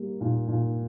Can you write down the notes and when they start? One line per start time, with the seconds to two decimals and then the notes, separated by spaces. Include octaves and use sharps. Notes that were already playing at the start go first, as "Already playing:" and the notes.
Already playing: G3 A#3
0.21 A#2
0.48 A#2